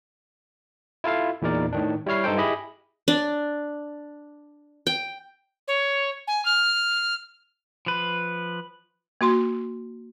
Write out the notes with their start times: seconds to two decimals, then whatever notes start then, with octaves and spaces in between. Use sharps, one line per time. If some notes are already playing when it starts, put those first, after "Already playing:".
1.04 E4 F4 A4 F5
1.42 E2 A#2 D#4 A#4 D5
1.73 A2 D#3 D4
2.06 G3 E4 C#5 F6 C7
2.24 G2 D#4 A4 C5 G5
2.37 E4 G4 G#4 D#5 B5
3.08 D4
4.87 G5
5.68 C#5
6.28 G#5
6.45 F6
7.86 F3 B4
9.21 A#3 F#4 C6